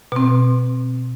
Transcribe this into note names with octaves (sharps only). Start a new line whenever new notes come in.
B2 C4